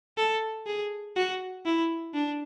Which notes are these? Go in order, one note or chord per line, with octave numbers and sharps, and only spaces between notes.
A4
G#4
F#4
E4
D4